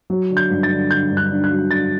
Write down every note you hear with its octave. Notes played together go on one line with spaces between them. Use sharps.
F#3
D3
G6
G2
A6
D3
D3 G6
G2
F#6
D3
F#6
F#3
D3 A6